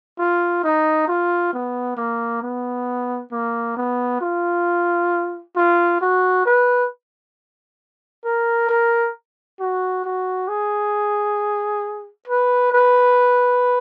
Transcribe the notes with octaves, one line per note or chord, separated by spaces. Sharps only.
F4
D#4
F4
B3
A#3
B3
A#3
B3
F4
F4
F#4
B4
A#4
A#4
F#4
F#4
G#4
B4
B4